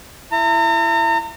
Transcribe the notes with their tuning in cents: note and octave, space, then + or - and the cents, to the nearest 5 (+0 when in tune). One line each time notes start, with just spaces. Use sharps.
E4 +20 A#5 -40